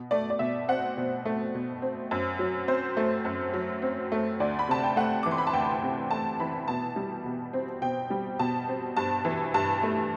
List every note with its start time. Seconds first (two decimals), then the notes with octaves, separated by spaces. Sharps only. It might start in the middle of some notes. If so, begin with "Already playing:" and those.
Already playing: B2
0.11 A3 D5
0.30 D5
0.39 B2 E5
0.68 C4 F#5
0.97 B2
1.25 A3
1.55 B2
1.82 C4
2.11 F#2
2.39 F#3
2.68 C4 C5
2.97 A3
3.25 F#2
3.54 F#3
3.82 C4
4.12 A3
4.40 D2 D5
4.59 B5
4.68 C3 A5
4.83 G5
4.96 A3 F#5
5.23 E3 D6
5.31 C6
5.38 B5
5.47 A5
5.53 D2 G5
5.83 C3
6.10 A3 A5
6.40 E3 B5
6.68 B2 A5
6.96 G3
7.25 B2
7.53 C4
7.82 B2 G5
8.10 G3
8.39 B2 A5
8.68 C4
8.97 G2 A5
9.25 E3
9.54 G2 A5
9.83 A3